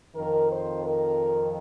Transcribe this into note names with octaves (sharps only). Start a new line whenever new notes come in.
F2 D#3 A#4
C5
A#4